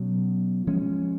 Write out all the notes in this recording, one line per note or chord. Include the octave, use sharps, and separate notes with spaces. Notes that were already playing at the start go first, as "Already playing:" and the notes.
Already playing: B2 F#3 C#4
F3 G#3 C#4